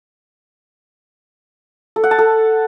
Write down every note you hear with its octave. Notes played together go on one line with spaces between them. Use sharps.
A4
F#5
A5
A4